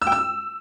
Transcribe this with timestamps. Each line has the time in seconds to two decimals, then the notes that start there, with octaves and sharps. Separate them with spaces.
0.02 E6
0.07 G5
0.12 E6